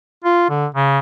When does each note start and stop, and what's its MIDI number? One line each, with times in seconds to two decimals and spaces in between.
0.24 0.46 65
0.50 0.66 50
0.75 0.99 49